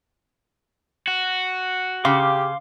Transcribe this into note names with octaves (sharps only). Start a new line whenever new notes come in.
F#4
C#3 G4 F5 C6 D6